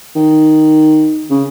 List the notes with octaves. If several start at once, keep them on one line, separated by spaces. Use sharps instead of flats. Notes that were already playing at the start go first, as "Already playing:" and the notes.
D#3
C#3